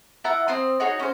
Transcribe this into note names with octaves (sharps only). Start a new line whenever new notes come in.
E4 F4 F#5 A#5
C4 C5 C6 D#6
D#4 F#4 G#4 C#5
C#4 C5